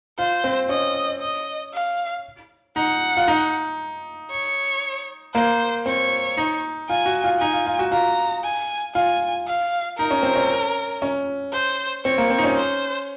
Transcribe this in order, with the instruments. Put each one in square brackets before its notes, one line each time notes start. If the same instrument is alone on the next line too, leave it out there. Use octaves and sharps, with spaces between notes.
[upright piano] F4 [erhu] C5
[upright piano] C4
[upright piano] C#4 [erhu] D#5
[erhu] D#5
F5
[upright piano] D#4 [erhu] F#5
[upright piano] F4
D#4
[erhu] C#5
[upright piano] A#3 [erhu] C5
[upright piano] C4 [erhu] C#5
[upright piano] D#4
[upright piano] F4 [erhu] G#5
[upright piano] F#4
F4
[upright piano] D#4 [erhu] G#5
[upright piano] F4
F4
F#4
[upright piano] F4 [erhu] A#5
[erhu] G#5
[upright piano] F4 [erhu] G#5
[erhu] F5
[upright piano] D#4 [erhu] A#4
[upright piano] C#4
C4
C#4
C#4
[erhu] C5
[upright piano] C4 [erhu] C#5
[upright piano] A#3
C4
D#4
C#4
[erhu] C5